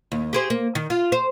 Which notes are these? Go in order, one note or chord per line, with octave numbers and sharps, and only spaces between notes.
D#2
G4 G#4 C5
A#3
D#3
F4
C5